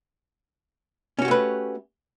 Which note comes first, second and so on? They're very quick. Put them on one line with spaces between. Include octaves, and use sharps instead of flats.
C#4 F#4 G4 A3 B4